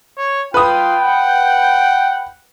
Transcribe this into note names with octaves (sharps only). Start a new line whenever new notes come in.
C#5
F4 B4 G5 D#6
F#5